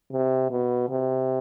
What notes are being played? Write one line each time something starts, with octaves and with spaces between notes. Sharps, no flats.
C3
B2
C3